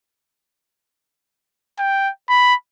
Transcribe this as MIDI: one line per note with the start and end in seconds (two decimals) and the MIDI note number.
1.79 2.10 79
2.29 2.55 83